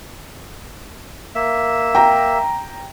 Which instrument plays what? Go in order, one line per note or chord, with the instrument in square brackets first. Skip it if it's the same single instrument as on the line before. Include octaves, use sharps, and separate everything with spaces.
[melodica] A#3 E5
[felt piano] G5 A#5